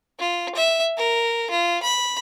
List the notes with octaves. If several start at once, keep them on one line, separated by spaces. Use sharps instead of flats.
F4
E5
A#4
F4
B5